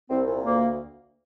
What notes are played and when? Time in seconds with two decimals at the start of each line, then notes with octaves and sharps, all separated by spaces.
0.10 C2 C4
0.27 A#2
0.45 D2 A#3